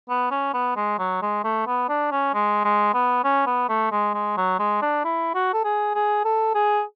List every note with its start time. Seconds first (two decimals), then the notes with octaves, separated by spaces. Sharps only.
0.09 B3
0.31 C#4
0.54 B3
0.76 G#3
0.99 F#3
1.22 G#3
1.44 A3
1.67 B3
1.89 D4
2.11 C#4
2.34 G#3
2.65 G#3
2.94 B3
3.24 C#4
3.47 B3
3.69 A3
3.92 G#3
4.14 G#3
4.37 F#3
4.59 G#3
4.82 D4
5.05 E4
5.35 F#4
5.53 A4
5.65 G#4
5.95 G#4
6.25 A4
6.55 G#4